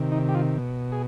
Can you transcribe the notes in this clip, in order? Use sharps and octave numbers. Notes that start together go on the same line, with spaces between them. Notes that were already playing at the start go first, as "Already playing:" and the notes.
Already playing: C3 D#3
D#4
G4
F4
B2
G#4